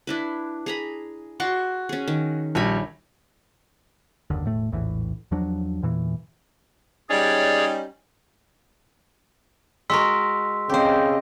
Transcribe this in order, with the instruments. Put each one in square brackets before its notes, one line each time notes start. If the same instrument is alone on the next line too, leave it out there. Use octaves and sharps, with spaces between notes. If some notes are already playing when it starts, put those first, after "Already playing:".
[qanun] D4 E4 B4
G#4 A#5 B5
[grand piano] F#4 [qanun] D5 C6 C#6
[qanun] C#4 G#4
D#3
[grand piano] A#1 G3 [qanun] C#5 G#5 B5
[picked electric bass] F#1 D#2 D3
E1 A2 A3
A#1 E2 A2 E3
E2 F3 F#3 D4
E2 A#2 E3
[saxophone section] G3 C#4 D#4 [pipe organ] G#4 C#5 D5
[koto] G#3 F#4 A#4 [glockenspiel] C6 E6 B6
[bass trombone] C#3 [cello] C4 D#5 [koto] G4 C5